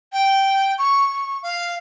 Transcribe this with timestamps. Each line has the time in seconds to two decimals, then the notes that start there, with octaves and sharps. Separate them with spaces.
0.13 G5
0.78 C#6
1.43 F5